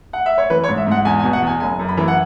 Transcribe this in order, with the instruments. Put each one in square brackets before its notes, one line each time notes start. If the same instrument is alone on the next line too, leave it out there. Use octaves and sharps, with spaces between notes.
[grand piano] F#5
E5
C#5
E3 B4
C#5
G#2
E5
G#2 F#5
E2 G#5
G#5
B2
F#5
E2 G#5
F#1 G#5
F#2
B5
E3
F#5